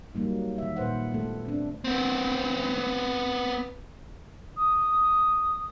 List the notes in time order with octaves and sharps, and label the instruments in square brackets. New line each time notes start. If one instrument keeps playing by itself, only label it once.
[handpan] F#3 G3 A#3 D#4
D#3 E5
A#2 B4 C5 F#5
A3 B3 A4
C4 D4
[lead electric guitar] B3 C4
[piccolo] D#6